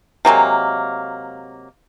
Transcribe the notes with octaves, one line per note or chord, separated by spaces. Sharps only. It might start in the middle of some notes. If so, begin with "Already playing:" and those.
C3 F#3 G#3 A#3